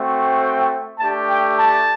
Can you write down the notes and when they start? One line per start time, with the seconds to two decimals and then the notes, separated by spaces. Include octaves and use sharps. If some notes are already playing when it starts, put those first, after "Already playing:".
Already playing: A3 C4 F#4
0.41 G5
0.99 A3 D4 G4 A5
1.30 G5
1.58 A5